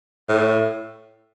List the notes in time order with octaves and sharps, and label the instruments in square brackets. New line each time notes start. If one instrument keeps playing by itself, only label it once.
[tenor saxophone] A2